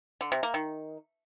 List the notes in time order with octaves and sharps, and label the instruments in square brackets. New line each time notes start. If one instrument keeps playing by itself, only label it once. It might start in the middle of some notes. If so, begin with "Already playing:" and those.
[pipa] D3
C3
A#3
D#3